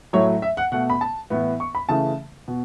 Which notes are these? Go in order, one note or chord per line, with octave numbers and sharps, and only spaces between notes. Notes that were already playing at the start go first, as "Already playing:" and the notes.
A2 F#3 A3 C#5
E5
F#5
B2 A3 F#5
B5
A5
A2 E3 B3
C#6
B5
C#3 E3 A3 A5
B2